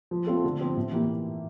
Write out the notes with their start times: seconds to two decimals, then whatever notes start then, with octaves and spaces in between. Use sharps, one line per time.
0.11 F3
0.27 A3 C4 F4 A4
0.44 D3
0.60 F3 C4
0.76 A2
0.93 E3 A#3 E4 G4